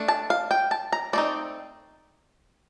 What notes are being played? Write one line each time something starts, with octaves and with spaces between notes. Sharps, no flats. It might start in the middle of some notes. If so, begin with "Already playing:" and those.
Already playing: A3 D4
A5
F5
G5
A5
A#5
A3 C4 D#4 D5